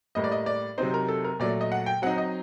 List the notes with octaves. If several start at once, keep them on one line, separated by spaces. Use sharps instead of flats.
A2 G3 A#3 D#5
D5
D#5
D5
C3 F#3 C4 D#4 C5
A#4
A4
A#4
A#2 F#3 A3 D5
D#5
F#5
G5
F#3 C4 D#4 F#5
D#5